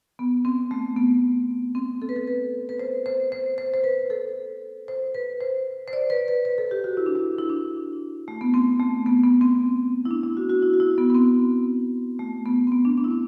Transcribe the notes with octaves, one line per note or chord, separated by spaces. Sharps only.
B3
C4
A3
B3
C4
A4
B4
A4
B4
B4
C5
C5
C5
C5
C5
B4
A4
C5
B4
C5
C5
D5
B4
B4
B4
A4
G4
F#4
E4
D4
E4
E4
D4
A3
B3
C4
A3
B3
B3
C4
E4
D4
E4
F#4
F#4
E4
F#4
E4
B3
B3
C4
A3
B3
C4
B3
D4
D4
E4
D4